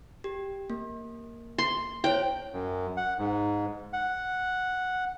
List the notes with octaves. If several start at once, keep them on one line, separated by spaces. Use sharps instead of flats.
G4
A#3
C6
E4 C5 C#5 G5
F#2
F#5
G#2
F#5